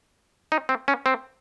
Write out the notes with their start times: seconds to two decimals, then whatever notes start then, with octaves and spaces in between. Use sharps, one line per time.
0.52 D#4
0.69 C4
0.88 C#4
1.06 C4